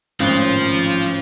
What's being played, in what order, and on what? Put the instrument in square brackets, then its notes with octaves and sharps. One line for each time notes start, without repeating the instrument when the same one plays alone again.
[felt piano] G#1 A2 F#6 [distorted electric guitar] F3 F4 [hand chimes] C#4